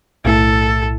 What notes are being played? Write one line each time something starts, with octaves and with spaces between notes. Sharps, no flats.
B1 A2 A3 E4 A4